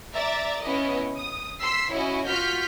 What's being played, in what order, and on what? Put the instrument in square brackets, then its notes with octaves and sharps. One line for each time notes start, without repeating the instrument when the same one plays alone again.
[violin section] D5 E5 A#5 A6
B3 C#4 E4 D#5
D#6
C6 E6 B6 C7
C#4 E4 F#4 D#5 G#5
F4 F#4 F6 G6 B6